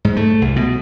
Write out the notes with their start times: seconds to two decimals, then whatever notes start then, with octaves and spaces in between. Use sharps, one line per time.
0.05 G#2
0.16 A3
0.42 C2
0.56 B2